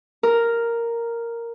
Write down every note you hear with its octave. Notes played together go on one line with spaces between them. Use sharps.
A#4